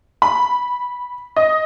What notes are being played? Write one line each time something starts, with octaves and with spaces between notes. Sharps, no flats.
B5
D#5